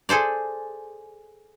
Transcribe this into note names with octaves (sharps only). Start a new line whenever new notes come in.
G#4 A4 C5 D5